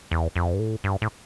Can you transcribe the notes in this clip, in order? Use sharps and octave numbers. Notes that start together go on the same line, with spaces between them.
E2
F2
G2
A2
G2
A2